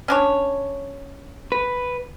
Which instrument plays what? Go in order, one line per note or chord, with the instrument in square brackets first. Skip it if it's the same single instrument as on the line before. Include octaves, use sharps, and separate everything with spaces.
[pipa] C#4 D4 C#5
[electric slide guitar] B4